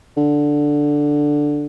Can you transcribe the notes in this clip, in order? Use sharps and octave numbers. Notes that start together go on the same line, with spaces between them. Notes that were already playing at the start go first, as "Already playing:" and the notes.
D3